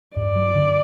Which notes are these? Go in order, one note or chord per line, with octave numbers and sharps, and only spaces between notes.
G2 D5
F#3
D3